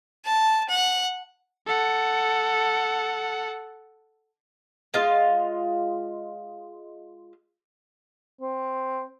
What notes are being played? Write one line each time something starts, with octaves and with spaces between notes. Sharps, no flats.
A5
F#5
A4 F#5
G#3 F4 D#5 F5
C4